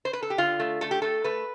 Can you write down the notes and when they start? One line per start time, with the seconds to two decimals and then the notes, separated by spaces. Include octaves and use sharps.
0.05 C5
0.13 B4
0.22 A4
0.30 G4
0.38 D3 F4
0.60 A3
0.81 A3 A4
0.91 G4
1.02 A3 A4
1.24 A3 B4